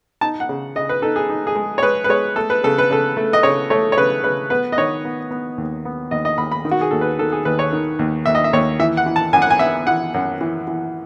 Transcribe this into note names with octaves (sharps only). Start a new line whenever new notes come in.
D#4 A5
F#5
C#3
C#3 D#5
B4
D#4 A4
G#4
D#4
G#4
G#3
C#5
G#3 B4
B4
G#3 C#5
A3 A4
B4
C#3 A4
B4
C#3 A4
A3
D#5
C#3 C#5
A3 C#5
C#5
C#3 B4
C#3 B4
B3 B4
D#5
D#3 C#5
B3
B3
D#2
B3
D#2 D#5
D#5
D#2 B5
B5
D#3
F#4
G#4
D#2 A4
B4
D#3 A4
G#4
D#2 B4
C#5
D#3
D#2
D#2 E5
D#5
E5
D#2 C#5
E3 E5
F#5
E3
A5
F#2 G#5
F#5
G#5
B3 E5
E3 F#5
F#2
E3
E3